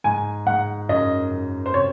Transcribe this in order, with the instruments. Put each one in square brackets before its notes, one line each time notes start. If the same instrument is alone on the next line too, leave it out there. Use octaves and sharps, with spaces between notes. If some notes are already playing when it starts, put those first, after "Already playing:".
[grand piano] G#2 [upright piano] G#5
[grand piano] G#2 [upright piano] F#5
[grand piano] F#2 [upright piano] D#5
[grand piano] F#2
[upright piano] C5
[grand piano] C3 [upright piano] C#5